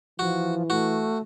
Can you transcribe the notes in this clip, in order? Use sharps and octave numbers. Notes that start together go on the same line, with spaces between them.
E3 F3 F#4
A3 F#4